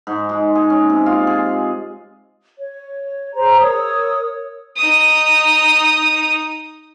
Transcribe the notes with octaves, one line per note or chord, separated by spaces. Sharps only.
G#2
G#3
G#4
C#4
C3
F4
G#4
C#5
G#4 C5 A#5
A#4 C#5 D#6 E6
D#4 D#6